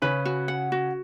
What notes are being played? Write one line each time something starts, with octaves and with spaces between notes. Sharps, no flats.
C#3 C#4 B4
F#4
F#5
F#4